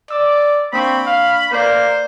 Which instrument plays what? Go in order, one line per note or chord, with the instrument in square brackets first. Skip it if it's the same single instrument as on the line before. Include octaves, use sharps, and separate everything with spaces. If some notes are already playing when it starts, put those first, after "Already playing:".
[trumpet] D5 [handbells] D6 E6
[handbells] A#3 D4 C#6 [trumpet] C4 [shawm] B5
[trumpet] F5
[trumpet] A#3 [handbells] B4 D5 [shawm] C5